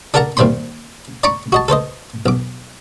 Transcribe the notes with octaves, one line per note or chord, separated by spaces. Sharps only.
D4 A4 A#4 F#5 A5 A#5
D#2 C3 G3 C5 B5 C6
D5 A#5 B5 C#6 D6
F#4 D#5 A5
A4 B4 C5 D#5
B1 D6